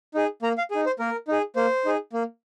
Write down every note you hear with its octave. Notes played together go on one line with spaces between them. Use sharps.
D#4 G#4
A#3 A#5
F5
D#4 G#4
C5
A#3 A#4
D#4 G#4
A#3 C5
D#4 G#4
A#3